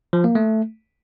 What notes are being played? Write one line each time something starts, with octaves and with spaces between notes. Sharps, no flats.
F3
A#3
A3